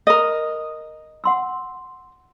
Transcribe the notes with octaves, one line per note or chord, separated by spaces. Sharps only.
A#4 D#5
F#5 C6 E6